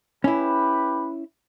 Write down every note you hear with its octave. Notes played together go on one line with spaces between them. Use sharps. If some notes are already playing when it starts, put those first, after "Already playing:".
C#4 E4 G4 B4